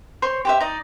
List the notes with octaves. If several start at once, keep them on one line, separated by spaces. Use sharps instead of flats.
C5 C#5 C6 C#6
G4 C5 E5
D#4 D5 D#5